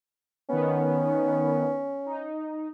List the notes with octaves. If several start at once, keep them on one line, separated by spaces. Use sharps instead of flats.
D#3 B3 C#4
D#4